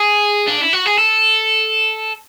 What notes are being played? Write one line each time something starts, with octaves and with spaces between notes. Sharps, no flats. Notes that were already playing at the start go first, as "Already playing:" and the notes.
Already playing: G#4
D4
E4
F#4
G#4
A4